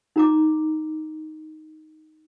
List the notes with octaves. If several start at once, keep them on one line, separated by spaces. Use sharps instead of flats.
D#4 A#5 D6